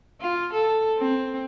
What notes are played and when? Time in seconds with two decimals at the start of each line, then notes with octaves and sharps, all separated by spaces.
0.20 F4
0.53 A4
0.98 C4